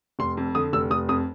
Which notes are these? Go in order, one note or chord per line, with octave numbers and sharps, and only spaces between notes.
F1 C6
F2
D3 D#6
F1 E6
F1 D#6
F2 D#6